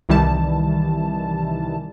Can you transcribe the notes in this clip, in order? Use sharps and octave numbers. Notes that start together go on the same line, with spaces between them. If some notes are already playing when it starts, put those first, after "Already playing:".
C2 D#3 E3 G3 A5